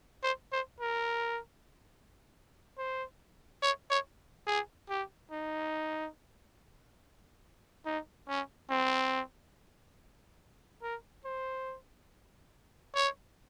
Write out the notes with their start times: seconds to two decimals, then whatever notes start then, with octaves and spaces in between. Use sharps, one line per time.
0.23 C5
0.52 C5
0.80 A#4
2.78 C5
3.63 C#5
3.90 C#5
4.47 G#4
4.90 G4
5.32 D#4
7.86 D#4
8.28 C#4
8.71 C4
10.83 A#4
11.25 C5
12.95 C#5